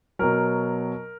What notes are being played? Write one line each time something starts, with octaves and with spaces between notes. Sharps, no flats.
B2 F#3 A#4